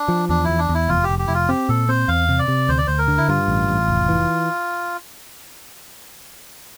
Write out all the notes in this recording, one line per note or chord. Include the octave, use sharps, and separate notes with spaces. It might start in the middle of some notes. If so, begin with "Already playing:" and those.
Already playing: D4
F3
E2 D4
E2 E4
D4
E2 E4
F1 F4
G4
F1
G4
F1 E4
F4
C4 G4
A#2 A4
C4 C5
E2 F5
C3
D5
C3
D2 C5
D5
D2 C5
A#4
D3
E4
G2 F4
A1
A1
F1
E3